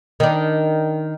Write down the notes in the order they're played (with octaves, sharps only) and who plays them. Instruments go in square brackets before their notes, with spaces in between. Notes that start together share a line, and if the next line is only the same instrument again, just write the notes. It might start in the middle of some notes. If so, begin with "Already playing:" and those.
[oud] D#3 D4